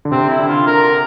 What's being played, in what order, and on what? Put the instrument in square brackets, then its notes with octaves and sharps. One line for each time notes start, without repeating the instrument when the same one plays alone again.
[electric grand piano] D3
[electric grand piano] C3 [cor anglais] C4
[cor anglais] E4
[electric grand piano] D3
[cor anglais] F4
A#4